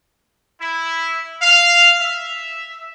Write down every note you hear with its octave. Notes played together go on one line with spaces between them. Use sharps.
E4
F5
E5